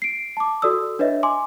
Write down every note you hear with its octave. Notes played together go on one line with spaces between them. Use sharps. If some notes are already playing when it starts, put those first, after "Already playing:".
C7 D7
A5 D6
F#4 A4 D5 D#6 E6
D4 B4 C#5 D#5 E5
G#5 C6 D6